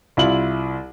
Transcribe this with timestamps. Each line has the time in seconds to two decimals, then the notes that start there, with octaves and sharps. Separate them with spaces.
0.17 C2 E4 F4 F#7